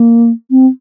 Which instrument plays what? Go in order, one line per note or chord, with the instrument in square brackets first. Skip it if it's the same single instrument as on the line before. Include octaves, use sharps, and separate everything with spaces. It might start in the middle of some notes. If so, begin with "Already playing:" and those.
Already playing: [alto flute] A#3
C4